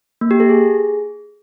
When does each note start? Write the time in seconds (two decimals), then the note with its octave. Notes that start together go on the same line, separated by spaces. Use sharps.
0.21 A#3
0.31 G4
0.40 A4
0.49 G#4